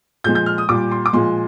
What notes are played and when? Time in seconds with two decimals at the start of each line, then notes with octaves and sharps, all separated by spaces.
0.24 A#2 F3 G#3 G6
0.35 G6
0.46 F6
0.58 D#6
0.69 A#2 G3 D6
0.91 C6
1.06 D6
1.13 A#2 F3 G#3 C6